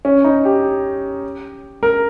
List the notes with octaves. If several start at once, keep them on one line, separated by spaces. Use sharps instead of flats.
C#4
D#4
G4
A#4